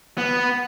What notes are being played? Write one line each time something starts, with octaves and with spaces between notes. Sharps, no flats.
B3